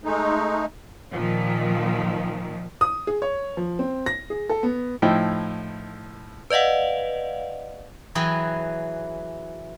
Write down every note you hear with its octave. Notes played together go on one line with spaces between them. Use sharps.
G#3 A3 D#4
A#2 D#3 F3
D#6
G#4
C#5
F3
C4
A#6
G#4
A4
B3
A2 F3 D#4 E4 G5
B4 D5 D#5 F5 F#5
E3 F#3 G#4 B4 G5 B5